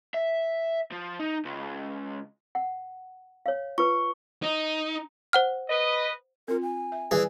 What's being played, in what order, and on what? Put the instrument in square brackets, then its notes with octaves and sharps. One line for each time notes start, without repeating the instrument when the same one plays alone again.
[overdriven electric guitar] E5
F3
D#4
C#2
[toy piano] F#5
C#5 F5
[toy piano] F4 B4 [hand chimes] C#6
[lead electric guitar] D#4
[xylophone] C5 F#5 F6
[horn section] B4 D#5
[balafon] C4 F4 [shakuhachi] A#4
[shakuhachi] G#5
[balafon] E5
[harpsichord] E3 G#4 [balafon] G3 D5